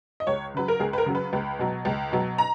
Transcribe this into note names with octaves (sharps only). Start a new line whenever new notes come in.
D#5
C#2 C#5
C#3 F#3 B4
A#4
C#2 G#4
B4
A#4
C#3 F#3
B4
C#2
B2 F#3
C#2
B2 F#3
A#5